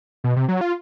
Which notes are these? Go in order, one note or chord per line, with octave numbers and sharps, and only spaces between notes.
B2
C3
F#3
F4